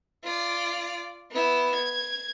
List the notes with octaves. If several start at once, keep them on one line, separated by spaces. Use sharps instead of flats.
F4 D5
B3 E4
G#6